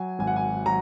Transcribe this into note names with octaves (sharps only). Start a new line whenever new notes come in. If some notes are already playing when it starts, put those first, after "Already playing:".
Already playing: F#3 G#5
G#1 G#5
F#5
G#5
F#3 A#5